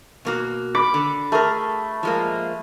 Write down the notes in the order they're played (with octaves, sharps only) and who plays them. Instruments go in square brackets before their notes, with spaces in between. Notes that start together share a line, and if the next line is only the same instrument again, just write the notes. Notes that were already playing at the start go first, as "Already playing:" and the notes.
[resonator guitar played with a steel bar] B2 A#3 F#4
[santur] B5 D6
[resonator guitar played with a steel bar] D3
[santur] A3 [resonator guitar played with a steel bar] G#4 A#4
[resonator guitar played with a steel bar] F3 G#3 A#3